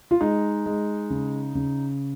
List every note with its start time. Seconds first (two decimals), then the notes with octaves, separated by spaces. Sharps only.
0.11 F4
0.21 G#3 D#4
0.66 G#3
1.10 C#3
1.55 C#3